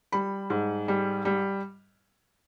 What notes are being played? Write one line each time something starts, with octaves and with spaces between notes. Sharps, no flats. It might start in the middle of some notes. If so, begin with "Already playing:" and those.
G3 B5
G#2
G3
G3